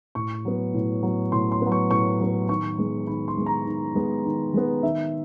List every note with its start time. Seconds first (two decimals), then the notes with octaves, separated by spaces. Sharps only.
0.15 A2 C#6
0.45 F#3 B3
0.74 A2
1.03 F#3 B3
1.32 A2 C6
1.52 C6
1.62 F#3 B3
1.72 C#6
1.91 A2 C#6
2.20 F#3 B3
2.49 D#3 C#6
2.78 G#3 B3
3.07 D#3 B5
3.28 C6
3.37 G#3 B3
3.46 A#5
3.66 D#3
3.95 G#3 B3
4.25 D#3
4.54 G#3 B3
4.83 D#3 E5